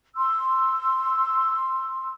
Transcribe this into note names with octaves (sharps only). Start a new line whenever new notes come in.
C6 E6